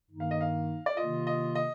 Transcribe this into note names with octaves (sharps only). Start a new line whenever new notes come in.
G2 D#3 A#3 D#4
F5
D#5
F5
D5
C3 D#3 A#3 F4 D#5
D#5
D#5